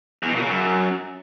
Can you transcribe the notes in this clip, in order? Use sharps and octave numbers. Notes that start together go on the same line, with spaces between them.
E2
B2
A#2
C#3
F#2